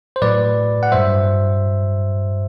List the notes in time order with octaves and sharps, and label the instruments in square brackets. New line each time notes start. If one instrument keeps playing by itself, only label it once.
[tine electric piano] C5
A2 F#3 B4 D5
F#5
G2 F#3 C5 E5